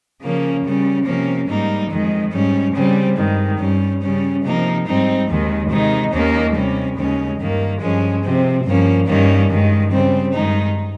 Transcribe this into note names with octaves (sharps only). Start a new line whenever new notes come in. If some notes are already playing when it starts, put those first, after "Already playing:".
C#3 F3 A#3 C#4
C#3 G3 C#4
C3 F3 A#3 C#4
G#2 G3 A#3 D#4
F2 D#3 G#3
G#2 G3 C#4
C#3 G3 C4
G2 D#3 G#3
G2 G3 C#4
C#3 G3 C#4
C3 F3 A#3 D#4
G#2 G3 C4 D#4
D#2 D#3 G#3
C3 D#3 G#3 D#4
D#2 D#3 A#3 C#4
C3 G3 C#4
D#2 C#3 G#3 C#4
G2 D#3 A#3
G2 F3 G#3 C#4
C3 F3 C4
G2 F3 A#3 C#4
G2 D#3 G3 A#3 C#4
G2 D#3 G#3
C#3 G3 C4
G2 D#3 G#3 D#4